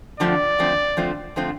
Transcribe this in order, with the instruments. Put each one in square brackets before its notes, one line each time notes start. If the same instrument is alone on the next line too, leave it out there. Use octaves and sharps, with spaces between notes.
[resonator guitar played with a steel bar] D3 F3 A3 C4 F4 [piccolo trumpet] D5
[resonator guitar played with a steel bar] D3 F3 A3 C4 F4
D3 F3 A3 C4 F4
D3 F3 A3 C4 F4